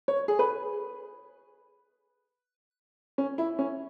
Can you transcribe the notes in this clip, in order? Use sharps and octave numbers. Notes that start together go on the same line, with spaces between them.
C#5
G#4
B4
C#4
E4
C#4